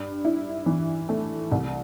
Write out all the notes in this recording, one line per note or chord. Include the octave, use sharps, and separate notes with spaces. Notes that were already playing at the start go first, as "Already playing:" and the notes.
Already playing: G2
E4
E3
A3
C2